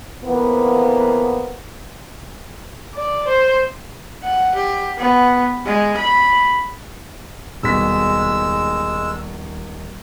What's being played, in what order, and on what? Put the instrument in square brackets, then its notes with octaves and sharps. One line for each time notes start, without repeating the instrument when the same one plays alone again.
[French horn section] F2 E3 F3 A#3 B3
[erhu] D5
C5
[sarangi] F#5
G4
B3
G#3
B5
[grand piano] D#1 B2 B6 [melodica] G#3 E6